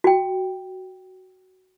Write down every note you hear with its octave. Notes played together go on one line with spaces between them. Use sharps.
F#4 G5